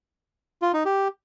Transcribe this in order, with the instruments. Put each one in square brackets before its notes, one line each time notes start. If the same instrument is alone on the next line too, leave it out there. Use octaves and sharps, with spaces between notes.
[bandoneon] F4
D#4
G4